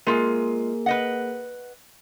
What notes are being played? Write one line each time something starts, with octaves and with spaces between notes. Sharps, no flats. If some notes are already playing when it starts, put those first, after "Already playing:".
G#3 A#3 F4 G#4 A#4
B4 D#5 F#5